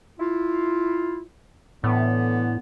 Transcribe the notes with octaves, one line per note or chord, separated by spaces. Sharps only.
E4 F4
A2 D3 E3 B3